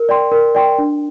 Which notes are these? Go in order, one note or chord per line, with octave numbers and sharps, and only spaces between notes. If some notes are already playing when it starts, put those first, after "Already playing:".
Already playing: A#4
D5 G5 C6
A#4
D5 G5 C6
D4